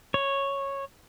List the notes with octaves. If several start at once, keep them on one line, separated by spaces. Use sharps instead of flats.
C#5